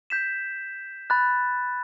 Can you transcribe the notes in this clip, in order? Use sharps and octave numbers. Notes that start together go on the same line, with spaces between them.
G6 B6 E7
B5 F#6 A6